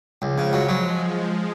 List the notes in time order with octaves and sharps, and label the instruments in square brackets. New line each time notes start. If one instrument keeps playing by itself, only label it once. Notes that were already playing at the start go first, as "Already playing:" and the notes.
[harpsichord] C#2 [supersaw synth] F3 G#3
[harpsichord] C#3
F#3
F#3